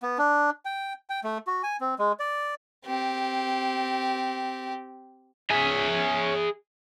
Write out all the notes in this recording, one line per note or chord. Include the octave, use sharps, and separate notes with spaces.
B3
D4
G5
G5
A3
F#4
G#5
C4
G#3
D5
C4 G4
G#4 C#5 E5 G#5